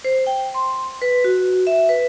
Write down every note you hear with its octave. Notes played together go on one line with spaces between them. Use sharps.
C5
G5
C6
B4
F#4
E5
B4